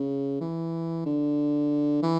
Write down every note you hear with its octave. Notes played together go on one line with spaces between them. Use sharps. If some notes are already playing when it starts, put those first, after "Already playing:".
Already playing: C#3
E3
D3
E3